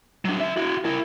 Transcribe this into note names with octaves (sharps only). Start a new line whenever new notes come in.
F#3 D4
D4 E5
E4 F#4
E4 A#4